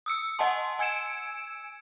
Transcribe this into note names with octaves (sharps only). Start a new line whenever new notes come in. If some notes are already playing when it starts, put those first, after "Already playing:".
D#6 E6 C#7
D#5 F#5 G#5 A5 C6
G#5 E6 G#6 C#7 D7 E7